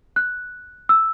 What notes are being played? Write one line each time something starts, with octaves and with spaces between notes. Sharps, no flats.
F#6
E6